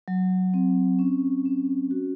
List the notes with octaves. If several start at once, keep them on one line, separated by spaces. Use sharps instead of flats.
F#3
C4
C#4
C#4
F#4